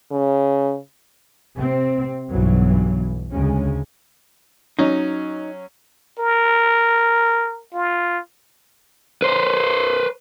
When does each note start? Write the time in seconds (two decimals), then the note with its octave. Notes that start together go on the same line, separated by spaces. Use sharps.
0.12 C#3
1.56 C3 C4
2.29 B1 G2 B2 E3 F#3
3.32 D2 C#3 G#3 C#4
4.79 F#3 C#4 D#4
6.19 A#4
7.73 F4
9.22 B4 C5